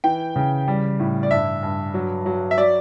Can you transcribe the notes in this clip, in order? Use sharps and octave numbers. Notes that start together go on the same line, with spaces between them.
E3 G5
C#3
G3
A2
D5
G2 E5
G2
F#3
F#3
E5
F#3 D5